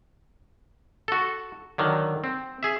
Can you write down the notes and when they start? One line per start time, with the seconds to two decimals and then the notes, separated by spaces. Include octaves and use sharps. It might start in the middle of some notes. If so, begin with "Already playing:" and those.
1.08 F#4 A4
1.78 D3 D#3 F#3
2.24 C4
2.63 G#4 E5